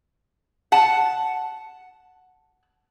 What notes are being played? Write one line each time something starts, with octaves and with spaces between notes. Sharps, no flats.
F#5 A5